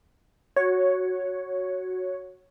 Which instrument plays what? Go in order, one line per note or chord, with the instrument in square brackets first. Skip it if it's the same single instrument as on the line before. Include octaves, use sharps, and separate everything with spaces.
[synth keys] F#4 C#5